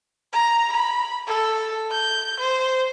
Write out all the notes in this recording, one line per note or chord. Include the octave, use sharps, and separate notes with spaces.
A#5
B5
A4
G6
C5